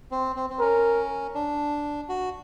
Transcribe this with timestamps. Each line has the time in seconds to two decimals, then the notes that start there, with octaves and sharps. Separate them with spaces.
0.11 C4
0.36 C4
0.50 C4
0.60 C#4 A#4
1.34 D4
2.09 F#4